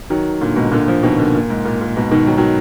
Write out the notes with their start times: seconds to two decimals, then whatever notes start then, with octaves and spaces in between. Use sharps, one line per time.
0.10 D#3 F#3
0.41 A#2 D3
0.56 G#2 B2
0.71 A#2 D3
0.87 D3 F3
1.02 B2 D#3
1.18 A#2 D3
1.35 A#2
1.50 G#2
1.65 A#2
1.81 A#2
1.97 G#2 B2
2.11 B2 D#3
2.27 D#3 F#3
2.38 D#3 F#3